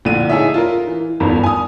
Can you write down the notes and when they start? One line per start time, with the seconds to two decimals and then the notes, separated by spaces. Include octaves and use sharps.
0.05 A#1 A2 D3 D#7
0.30 D#4 E4 G#4 A4 C#5 E5
0.54 F4 A#4
0.88 E3
1.20 G1 E2 G2 D#3
1.43 G#5 D#6